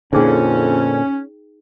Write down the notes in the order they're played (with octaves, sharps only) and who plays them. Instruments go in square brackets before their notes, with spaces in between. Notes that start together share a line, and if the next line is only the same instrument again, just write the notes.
[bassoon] F2 [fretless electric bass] A#2 D3 [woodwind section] C#4 [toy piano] D#4 G#4 G5